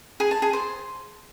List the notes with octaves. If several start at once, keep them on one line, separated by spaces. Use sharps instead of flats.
G#4
A5
G#4
C5